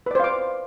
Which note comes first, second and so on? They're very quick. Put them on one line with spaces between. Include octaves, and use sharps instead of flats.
B4 D5 C5 F5 D6